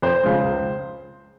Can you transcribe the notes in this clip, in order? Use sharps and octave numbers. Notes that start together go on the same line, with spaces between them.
F2 C5
C#3 F3 G#3
C#2